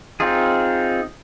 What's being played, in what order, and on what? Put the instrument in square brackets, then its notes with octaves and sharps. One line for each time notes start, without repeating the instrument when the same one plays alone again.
[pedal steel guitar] C4 D#4 F4 G#4